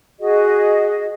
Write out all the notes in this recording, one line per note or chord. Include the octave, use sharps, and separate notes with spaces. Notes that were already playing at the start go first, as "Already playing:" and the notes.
F#4 G#4 D#5